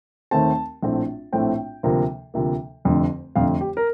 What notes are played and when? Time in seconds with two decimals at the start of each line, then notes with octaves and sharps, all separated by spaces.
0.31 D#2 D#3 A3 C4 A5
0.83 A#1 A2 A3 C4
1.33 A#1 A2 A3 C4 G5
1.83 D2 C3 F3 A#3
2.34 D2 C3 F3 A#3
2.85 F1 F2 D3 A3
3.35 F1 F2 D3 A3 F5
3.61 G4
3.77 A#4